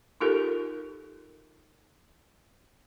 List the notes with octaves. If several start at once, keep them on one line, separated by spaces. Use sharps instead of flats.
D#4 F4 G4 A4 A#4